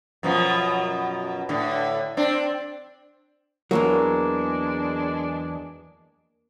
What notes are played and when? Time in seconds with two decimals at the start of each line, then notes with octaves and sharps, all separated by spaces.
0.23 F#2 B2 F3
1.49 A2 D3
2.17 C4 D4
3.71 E2 E3 F#3 G#3 A#3 D4